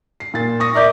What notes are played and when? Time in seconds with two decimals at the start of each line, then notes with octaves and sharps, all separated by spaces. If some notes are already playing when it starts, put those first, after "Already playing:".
0.20 C7
0.34 A#2 A6
0.60 C#6 D#6 A#6
0.75 A#4 D5 E5 D6 G6